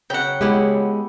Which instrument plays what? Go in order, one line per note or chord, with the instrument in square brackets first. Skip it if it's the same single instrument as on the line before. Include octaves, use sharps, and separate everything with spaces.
[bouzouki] C#3 F#3 [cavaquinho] F#5 G5
[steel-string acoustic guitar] G#3 [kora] B3 E4 G4